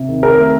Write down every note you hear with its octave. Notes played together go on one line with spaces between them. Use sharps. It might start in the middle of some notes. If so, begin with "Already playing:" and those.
Already playing: C3
D#3
C4 A#4
A3